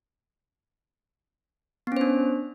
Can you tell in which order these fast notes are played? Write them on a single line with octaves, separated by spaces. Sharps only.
B3 C#4 C5 D4